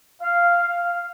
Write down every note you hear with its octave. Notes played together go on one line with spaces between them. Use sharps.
F5